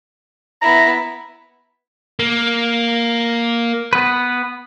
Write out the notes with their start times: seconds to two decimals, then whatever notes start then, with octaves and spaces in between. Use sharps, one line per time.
0.62 B3 E4 A#5
2.19 A#3
3.93 B3 B4